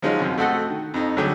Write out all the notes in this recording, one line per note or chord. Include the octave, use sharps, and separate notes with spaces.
F3 F#3 G#3 C#4 D#4 F4
C2 F#2 F3
A3 C4 F#4 A4 D#5 F#5
D#3
F2 D#4
D2 F#3 G3 A3 G4 G#4